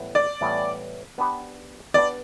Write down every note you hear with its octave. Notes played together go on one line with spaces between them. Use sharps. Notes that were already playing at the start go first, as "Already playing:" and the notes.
Already playing: A2 E3 G3 B3
D5
A2 E3 G3 B3
B3 D4 G4 B4
B3 D4 G4 B4 D5